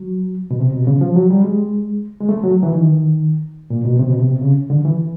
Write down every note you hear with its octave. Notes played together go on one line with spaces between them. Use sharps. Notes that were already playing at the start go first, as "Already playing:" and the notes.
Already playing: F#3
B2
C3
B2
C#3
F3
F#3
G3
G#3
G#3
A3
F#3
E3
D#3
A#2
B2
C3
B2
C3
C#3
D3
E3